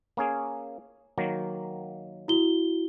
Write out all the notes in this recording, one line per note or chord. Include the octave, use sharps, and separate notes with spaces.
A#3 C#4 G#4
D#3 F#3 A#3
E4 F#4 G7